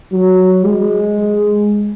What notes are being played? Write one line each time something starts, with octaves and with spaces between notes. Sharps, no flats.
F#3
G#3